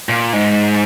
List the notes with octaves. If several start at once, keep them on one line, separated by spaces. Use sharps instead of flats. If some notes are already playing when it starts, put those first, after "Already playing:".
A#2
G#2